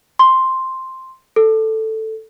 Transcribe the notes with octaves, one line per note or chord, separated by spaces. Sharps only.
C6
A4